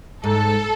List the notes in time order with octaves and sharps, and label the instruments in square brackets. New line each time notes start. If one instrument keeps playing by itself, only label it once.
[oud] G#2 [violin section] A4